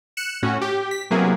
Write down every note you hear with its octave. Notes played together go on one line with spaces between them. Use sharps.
F#6 C#7 E7
A2 C#4 F#4
G4
B6
C3 F#3 A#3 B3 E4 G#4